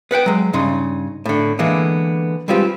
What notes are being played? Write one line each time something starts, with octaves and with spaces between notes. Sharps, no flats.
B3 B4 F#5 G5
F#3 G#3
G2 C#3 D#4 C6
A2 D3
D3 E3 G#3 A#3 B3
G3 G#3 C4 F4 G4 B4